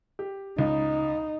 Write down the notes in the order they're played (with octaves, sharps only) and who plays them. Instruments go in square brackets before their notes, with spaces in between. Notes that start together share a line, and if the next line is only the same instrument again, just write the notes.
[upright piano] G4
[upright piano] C#2 [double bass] D#4